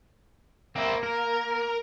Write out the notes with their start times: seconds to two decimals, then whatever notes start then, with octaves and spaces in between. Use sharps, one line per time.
0.76 A#3 C4 E4
1.03 A#4